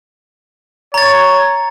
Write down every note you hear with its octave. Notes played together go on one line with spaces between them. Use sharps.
C#5 A#5 A6